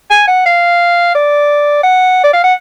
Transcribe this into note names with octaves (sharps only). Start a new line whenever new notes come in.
G#5
F#5
F5
D5
F#5
D5
F5
F#5